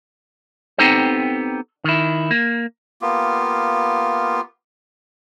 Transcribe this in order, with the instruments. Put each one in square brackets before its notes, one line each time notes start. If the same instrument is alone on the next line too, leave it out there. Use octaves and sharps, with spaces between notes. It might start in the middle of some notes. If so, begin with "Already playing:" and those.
[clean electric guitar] B3 C4 D#4 G4 A4 C5
D#3 E4
A#3
[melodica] A#3 B3 F4 G4